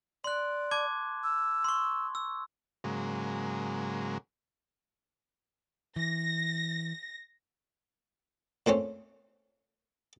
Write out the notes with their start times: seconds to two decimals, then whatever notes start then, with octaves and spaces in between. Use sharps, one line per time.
0.24 D5 C6 F#6
0.71 A5 D6 G#6
1.24 E6
1.64 C6 C#6
2.15 E6
2.84 G#2 C#3 F#3 G#3 A#3
5.96 E3 A#6
8.66 A#2 A3 C4 C#4